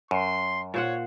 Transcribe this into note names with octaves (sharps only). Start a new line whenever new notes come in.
F#2 C6
A#2 C5 C#5 F#5